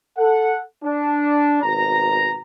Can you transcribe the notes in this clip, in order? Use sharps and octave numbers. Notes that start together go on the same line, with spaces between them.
A4 F#5
D4
G#1 B2 A#5